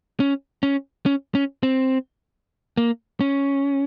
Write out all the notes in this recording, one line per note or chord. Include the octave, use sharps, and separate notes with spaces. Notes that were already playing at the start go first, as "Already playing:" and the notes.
C#4
C#4
C#4
C#4
C4
A#3
C#4